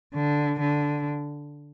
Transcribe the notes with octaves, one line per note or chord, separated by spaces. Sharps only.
D3
D3